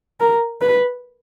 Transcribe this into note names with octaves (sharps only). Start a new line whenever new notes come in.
A#4
B4